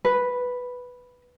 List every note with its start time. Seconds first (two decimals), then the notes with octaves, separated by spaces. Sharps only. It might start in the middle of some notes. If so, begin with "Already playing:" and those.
0.05 B4